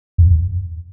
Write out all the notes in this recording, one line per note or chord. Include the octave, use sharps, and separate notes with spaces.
F2